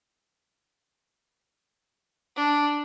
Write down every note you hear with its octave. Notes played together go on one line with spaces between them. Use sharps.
D4